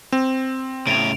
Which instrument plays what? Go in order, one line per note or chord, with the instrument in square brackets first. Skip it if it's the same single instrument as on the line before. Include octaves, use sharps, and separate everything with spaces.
[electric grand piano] C4
[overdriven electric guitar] A2 C#3 [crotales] D7 F7